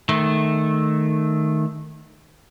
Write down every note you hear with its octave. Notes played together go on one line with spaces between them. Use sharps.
D#3 A3